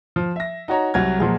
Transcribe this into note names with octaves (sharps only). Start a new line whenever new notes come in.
F3
E5 A#6
D#4 F#4 C#5 A#5
C2 F#3 G#6
A#2 F3 F#3 G#3